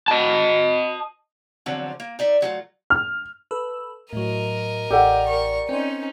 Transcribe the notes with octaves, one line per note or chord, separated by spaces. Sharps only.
D#5 A5
E2 D3 F3 F#3 C4
A#3
D#4 D5 E5
D2 F#3 A3 F4
F6
A4 B4 E6
A2 F#3 A#4 D#5
A1 G4 A4 D5 F#5 G5
A#4 C#6
C4 C#4 D#4 C5